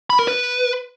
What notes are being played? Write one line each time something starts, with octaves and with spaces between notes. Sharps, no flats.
B5
A#4
B4